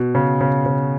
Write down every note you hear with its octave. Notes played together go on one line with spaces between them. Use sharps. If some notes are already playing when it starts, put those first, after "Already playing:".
Already playing: B2
C#3
C#3
C#3